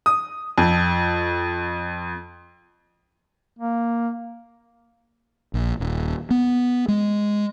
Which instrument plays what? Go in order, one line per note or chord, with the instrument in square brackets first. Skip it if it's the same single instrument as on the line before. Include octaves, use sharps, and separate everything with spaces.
[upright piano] D#6
F2
[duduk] A#3
[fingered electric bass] A#1
D#1
B3
G#3